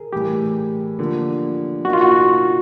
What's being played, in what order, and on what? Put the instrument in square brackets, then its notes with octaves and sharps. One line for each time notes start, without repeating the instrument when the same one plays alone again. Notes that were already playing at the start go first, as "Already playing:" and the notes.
Already playing: [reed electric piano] G#4 A#4
[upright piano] A2 E3 G3 [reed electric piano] G4
[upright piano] D3 F3 A#3
[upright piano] F#3 A#3 D#4 [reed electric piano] F#4
[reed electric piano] F4
F#4